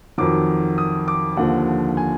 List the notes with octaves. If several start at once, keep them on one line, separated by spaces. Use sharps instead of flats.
F2 D#3 F#3 D6
D#6
D6
D#2 D3 F3 F#5
G#5